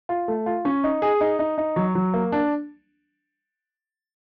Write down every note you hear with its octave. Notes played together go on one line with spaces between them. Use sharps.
F4
A3
F4
C#4
D#4
G#4
D#4
D#4
D#4
F#3
F#3
A#3
D4